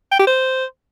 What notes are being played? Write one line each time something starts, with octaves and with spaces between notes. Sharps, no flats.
G5
G4
C5